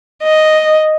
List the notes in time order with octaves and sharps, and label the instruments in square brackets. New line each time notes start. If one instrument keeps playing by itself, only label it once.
[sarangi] D#5